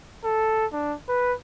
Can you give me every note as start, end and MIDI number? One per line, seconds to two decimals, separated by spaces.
0.24 0.66 69
0.73 0.94 62
1.09 1.33 71